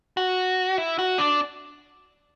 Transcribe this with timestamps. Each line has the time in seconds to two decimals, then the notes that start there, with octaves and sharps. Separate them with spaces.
0.17 F#4
0.78 E4
0.99 F#4
1.18 D4